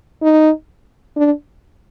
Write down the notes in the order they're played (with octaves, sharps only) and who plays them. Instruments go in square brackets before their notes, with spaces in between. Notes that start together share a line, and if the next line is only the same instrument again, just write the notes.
[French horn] D#4
D4